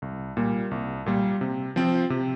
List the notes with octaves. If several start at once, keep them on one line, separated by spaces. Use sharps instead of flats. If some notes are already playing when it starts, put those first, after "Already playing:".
C2
A#2 G3 A#3
C2
A#2 G3 A#3
C3
F3 C4 F4
C3